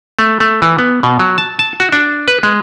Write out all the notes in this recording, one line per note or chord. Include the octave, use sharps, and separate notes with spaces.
A3
A3
E3
B3
B2
F#3
A5
A5
F#4
D4
B4
G#3